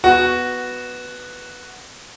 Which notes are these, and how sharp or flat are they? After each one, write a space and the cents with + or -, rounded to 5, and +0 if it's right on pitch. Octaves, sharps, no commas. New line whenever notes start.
B3 +0 F#4 +0